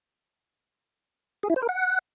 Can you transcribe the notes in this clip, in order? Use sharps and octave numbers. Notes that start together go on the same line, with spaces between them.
G#4
E4
C5
A#4
F#5